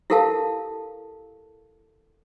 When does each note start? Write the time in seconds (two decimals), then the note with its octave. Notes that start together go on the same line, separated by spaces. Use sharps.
0.10 E4 G4 A4 A#4 F5 A5